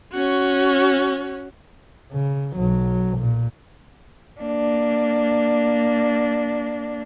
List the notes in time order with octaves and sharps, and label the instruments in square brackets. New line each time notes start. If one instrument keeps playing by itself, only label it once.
[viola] C#4 F#4
[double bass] C#3
B1 F#3
A#2
[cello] A#3 D4